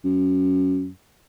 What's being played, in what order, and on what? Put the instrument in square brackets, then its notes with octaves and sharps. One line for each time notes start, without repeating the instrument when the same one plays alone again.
[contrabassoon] F#2